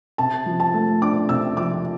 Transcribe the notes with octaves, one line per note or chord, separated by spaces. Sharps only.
C3 A5
F3
A5
A3
D4 D6
C3 E6
F3 D6